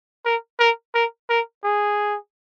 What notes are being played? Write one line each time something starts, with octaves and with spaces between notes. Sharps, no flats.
A#4
A#4
A#4
A#4
G#4